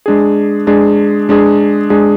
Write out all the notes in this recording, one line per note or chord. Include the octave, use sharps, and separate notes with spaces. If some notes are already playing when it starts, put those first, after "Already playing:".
G#3 D4 G#4
G#3 D4 G#4
G#3 D4 G#4
G#3 D4 G#4